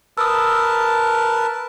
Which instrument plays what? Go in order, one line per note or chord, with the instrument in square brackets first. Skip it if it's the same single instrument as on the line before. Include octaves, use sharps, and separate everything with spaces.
[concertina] A#4 B4 A5 [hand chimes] D#6 E6